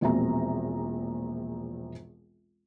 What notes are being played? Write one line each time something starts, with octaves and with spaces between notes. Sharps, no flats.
E1 A#1 C4 E5 A#5